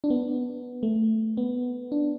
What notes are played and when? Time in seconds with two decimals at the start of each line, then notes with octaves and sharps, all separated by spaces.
0.04 D4
0.10 B3
0.83 A3
1.37 B3
1.92 D4